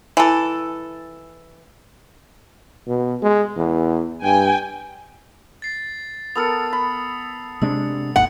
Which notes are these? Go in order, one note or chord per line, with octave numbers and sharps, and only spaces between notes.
E3 A4
B2
G#3
E2
G2 G5 G#5
A6 C7
B3 A4 A#4 D#6 E6 C#7
B5
C3 G#3 D4 E6
G#1 D#2 G#2 F#5